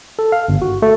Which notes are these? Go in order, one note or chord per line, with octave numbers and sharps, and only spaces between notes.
A4
F5
G1
F#4
A3